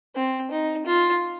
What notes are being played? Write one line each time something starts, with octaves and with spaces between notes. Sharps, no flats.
C4
D#4
F4